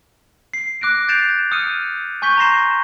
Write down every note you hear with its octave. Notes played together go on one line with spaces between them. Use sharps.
C7
D6 F#6 A#6 D7
G6 A6 C7 D7 E7 F7
D#6 F6 C#7 D#7
G#5 C#6 G6 B6 G7
A#5 C6 A#6 C7 E7